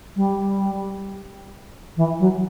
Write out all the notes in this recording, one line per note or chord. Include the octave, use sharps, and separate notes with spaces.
G3
E3
F#3